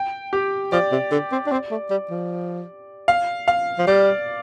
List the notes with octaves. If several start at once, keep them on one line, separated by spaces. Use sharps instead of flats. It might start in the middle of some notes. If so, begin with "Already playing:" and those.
Already playing: G5
G4
F3 D5
C3
D3
C4
D4
C4
A3
G3
F3
F5
F5
F3
G3 D5